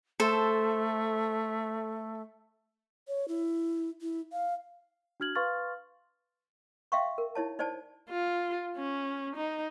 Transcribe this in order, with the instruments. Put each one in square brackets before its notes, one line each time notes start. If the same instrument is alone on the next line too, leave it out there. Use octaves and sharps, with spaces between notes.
[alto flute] A3 [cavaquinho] A4 C5
[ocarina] C#5
E4
E4
F5
[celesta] D4 F#4 F6 G#6 F#7
B4 F5 C6 C#6 F6 A6
[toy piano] E5 F5 G5 C6 C#6
A#4
D#4 E4 C#5 A5
D#4 C5 D5 G#5 A5
[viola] F4
C#4
D#4